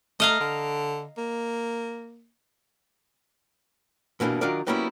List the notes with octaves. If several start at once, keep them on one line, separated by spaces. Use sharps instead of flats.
A3 D#5 F5 A#5
D3
A#3
G2 B2 E3 A#3 D4
D#3 F#3 D4 F4 A#4 D5
F#3 G3 A#3 B3 C#4 E4